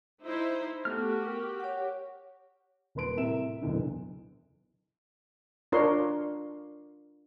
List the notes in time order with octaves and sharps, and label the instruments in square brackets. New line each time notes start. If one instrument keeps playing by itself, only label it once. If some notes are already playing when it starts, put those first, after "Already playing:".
[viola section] D#4 E4 C5
[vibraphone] A3 B3 A4 [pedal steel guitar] F#4 F6 [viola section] G4
[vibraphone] A#4
C#5 F#5
[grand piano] D#1 A#3 B4 C6 D7
A2 C3 A#4 E5 E7
F#1 B1 E2 D3
[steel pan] D4 F4 A#4 C#5 C6